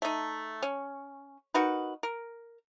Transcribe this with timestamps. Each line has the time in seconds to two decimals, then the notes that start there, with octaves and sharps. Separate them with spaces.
0.02 A3 D#4
0.62 C#4
1.54 D#4 F#4 A#4 B4
2.03 A#4